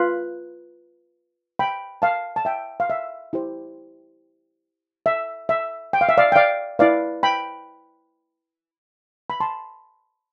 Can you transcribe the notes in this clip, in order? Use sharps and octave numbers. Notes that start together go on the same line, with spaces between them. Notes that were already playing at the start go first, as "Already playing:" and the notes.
Already playing: F4 B4
G5 B5
F5 A5
A5
E5 G5
F5
E5
E4 G4 C5
E5
E5
G5
F5
E5
D5 F5
G5
D5 F5
E4 B4 D5 F5
G5 B5
B5
A5 C6